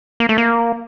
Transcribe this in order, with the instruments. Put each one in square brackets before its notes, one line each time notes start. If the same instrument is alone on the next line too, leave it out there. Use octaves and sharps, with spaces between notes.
[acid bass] A#3
A3
A#3